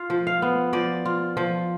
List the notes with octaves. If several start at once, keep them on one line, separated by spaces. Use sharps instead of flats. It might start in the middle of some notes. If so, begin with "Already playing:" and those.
Already playing: F4 F5
F3
F5
B3
F3 D5
F4
F3